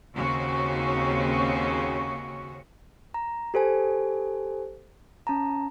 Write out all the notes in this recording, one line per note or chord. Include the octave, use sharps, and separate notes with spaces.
D#2 C#3 C4 C#4 F#4
A#5
G4 A4 C5 G#5
C#4 A5 A#5